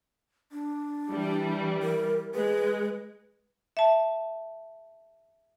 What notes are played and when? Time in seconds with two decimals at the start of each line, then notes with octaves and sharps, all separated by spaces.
0.52 D4
1.11 E3 G3
1.82 A#4
2.34 G#3 B4
3.77 E5 A5